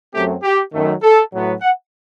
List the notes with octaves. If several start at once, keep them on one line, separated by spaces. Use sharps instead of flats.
F#2 F#3 A3 C4 G4
G4
F#2 D#3 A3
A4
A2 F#3 B3
F#5